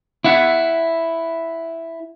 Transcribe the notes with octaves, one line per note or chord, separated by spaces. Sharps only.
E4 E5 F#5